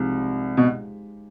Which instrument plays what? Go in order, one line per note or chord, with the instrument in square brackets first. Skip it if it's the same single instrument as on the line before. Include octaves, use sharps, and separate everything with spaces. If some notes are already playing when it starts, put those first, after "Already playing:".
Already playing: [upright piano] C2 [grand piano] F3 G#3 D#4 G4
[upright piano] B2